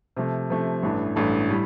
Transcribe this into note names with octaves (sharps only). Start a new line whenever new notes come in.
C3 F3 A3
C3 F3 A3
A1 G2 E3 A3 D4
A1 G2 E3 A3 D4
A2 G3